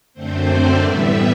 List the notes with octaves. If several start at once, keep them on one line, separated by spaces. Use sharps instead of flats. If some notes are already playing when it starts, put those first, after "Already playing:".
F#2 D3 A3 C4 C5
D5
A2 E3 G3 B3 E5